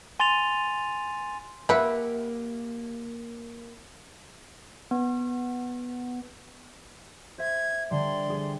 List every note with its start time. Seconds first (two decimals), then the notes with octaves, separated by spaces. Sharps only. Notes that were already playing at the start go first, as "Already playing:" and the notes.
0.20 G#5 C6 A6 D#7 F7
1.69 A#3 F4 G4 B4 E5 F#5
4.91 B3
7.38 C5 E5 G#6
7.91 D3 G3 D5 C6
8.30 G3 G#4